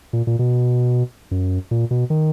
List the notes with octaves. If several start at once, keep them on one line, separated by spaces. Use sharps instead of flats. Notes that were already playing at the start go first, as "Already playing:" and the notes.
A#2
A#2
B2
F#2
A#2
B2
D#3